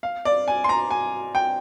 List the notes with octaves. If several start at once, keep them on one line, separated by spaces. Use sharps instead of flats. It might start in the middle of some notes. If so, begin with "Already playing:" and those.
F5
D5
G#5
C6
A#5
G#5
G5